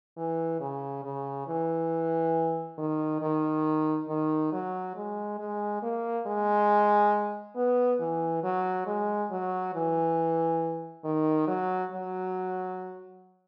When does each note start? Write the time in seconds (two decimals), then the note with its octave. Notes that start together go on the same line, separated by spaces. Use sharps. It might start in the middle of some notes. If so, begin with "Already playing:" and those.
0.17 E3
0.60 C#3
1.04 C#3
1.47 E3
2.78 D#3
3.21 D#3
4.09 D#3
4.52 F#3
4.96 G#3
5.39 G#3
5.82 A#3
6.26 G#3
7.56 B3
8.00 E3
8.43 F#3
8.86 G#3
9.30 F#3
9.74 E3
11.04 D#3
11.47 F#3
11.92 F#3